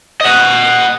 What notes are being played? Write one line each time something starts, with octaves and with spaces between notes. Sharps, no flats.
D#5 F#5